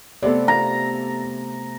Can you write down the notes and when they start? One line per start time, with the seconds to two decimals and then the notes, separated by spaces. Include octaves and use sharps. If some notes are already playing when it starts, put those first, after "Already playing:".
0.22 C3 A3 B3 A4 D5
0.48 A#5